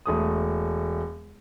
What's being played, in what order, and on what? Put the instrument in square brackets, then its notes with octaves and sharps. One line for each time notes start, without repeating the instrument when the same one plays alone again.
[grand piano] E1 A3 D#6